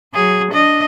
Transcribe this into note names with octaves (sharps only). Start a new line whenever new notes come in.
F#3 G#4
D4 D#5